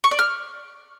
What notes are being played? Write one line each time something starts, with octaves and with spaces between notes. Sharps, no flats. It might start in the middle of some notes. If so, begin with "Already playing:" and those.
C#6
D5
F6